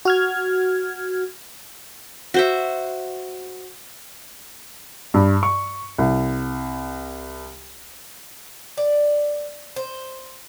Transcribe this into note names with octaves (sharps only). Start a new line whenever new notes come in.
F#4 F6 G#6
F#4 C5 E5
G2
C#6
C2
D5
C5